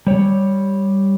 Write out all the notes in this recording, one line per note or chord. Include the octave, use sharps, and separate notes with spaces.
G3 C#5